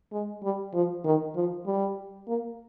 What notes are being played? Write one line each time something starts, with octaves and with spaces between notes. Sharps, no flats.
G#3
G3
F3
D#3
F3
G3
A#3